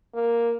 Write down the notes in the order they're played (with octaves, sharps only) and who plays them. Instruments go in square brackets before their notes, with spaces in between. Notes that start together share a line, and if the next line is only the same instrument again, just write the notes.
[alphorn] A#3